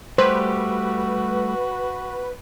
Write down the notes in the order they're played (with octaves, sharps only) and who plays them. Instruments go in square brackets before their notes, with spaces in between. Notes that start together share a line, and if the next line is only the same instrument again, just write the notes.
[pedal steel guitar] G3 A3 G4 [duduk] F#4 [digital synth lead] B4 [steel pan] C5